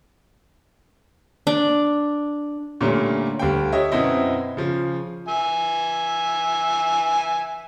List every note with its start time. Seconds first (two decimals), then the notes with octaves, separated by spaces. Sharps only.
1.47 D4
2.81 A#2 D3 G3 A3 A#3 C#4
3.39 D2 G3 F5 G5
3.72 G4 C#5 D#5 E5
3.92 F#2 B2 C4 E4 D#5
4.57 C#3 F3
5.28 E5 G#5